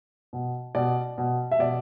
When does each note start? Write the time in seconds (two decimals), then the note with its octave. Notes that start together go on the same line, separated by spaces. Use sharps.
0.33 B2
0.75 B2 D5
1.18 B2
1.51 E5
1.59 B2 D5